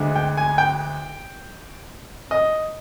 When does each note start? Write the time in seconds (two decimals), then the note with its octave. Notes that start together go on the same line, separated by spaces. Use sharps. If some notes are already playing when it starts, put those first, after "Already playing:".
Already playing: D2 D3 G#3
0.16 G5
0.37 G#5
0.58 G5
2.31 D#5